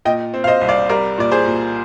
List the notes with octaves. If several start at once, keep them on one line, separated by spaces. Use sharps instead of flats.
A#2 D#5 G5
C4
F5
C5 D#5
C2
D5 F5
G3 A#4 D5
A#2 D5
G#4 C5
A#2